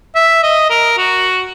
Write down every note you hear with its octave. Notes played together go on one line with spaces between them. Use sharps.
E5
D#5
A#4
F#4